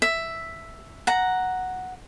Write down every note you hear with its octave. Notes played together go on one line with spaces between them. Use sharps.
E5
F#5 A#5